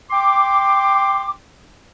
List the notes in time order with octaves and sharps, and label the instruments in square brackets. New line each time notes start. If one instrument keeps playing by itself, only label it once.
[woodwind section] G5 C6 D6